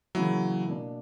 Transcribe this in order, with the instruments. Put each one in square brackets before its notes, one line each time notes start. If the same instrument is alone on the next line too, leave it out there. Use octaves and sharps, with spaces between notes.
[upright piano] C#3 E3 A#3 E4 [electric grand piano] F#3
[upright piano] B2 A#3 D4